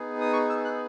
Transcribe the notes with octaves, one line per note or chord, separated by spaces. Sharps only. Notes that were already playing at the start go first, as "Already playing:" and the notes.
Already playing: B3 D#4 G#4
D#6
C#6
E6
F#6